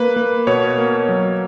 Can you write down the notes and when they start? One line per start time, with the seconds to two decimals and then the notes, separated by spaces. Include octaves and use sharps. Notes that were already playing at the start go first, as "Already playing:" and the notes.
Already playing: A#3 B4
0.16 A#3
0.47 B2 C#5
0.78 A#3
1.09 F#3